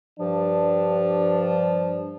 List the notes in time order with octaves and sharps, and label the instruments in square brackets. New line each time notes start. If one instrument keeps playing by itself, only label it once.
[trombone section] G2 D4 [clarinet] F3